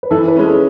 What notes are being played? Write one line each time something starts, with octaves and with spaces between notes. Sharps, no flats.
B4
E3 A4
B4
G#3 C#4
A4